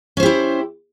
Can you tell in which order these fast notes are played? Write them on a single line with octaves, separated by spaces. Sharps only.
C#4 C5 G4 E4